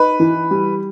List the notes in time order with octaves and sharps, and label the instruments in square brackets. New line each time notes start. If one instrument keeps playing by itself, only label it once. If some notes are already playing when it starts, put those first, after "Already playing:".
Already playing: [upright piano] D#4 [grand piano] B4
[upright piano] E3
G3